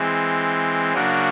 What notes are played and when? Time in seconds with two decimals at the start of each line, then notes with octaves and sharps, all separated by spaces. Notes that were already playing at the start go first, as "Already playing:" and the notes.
Already playing: E3 G#3 C4
0.93 C#3 F#3 A#3 D4 F#4